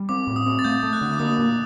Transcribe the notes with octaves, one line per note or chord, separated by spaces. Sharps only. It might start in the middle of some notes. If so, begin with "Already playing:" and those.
Already playing: G3
C4 D6
A2
D#6
C4
A6
A3 G6
A3
F#6
D3
D6
A#3 D#6
A#2